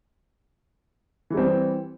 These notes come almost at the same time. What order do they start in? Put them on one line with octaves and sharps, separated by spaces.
E3 G3 C4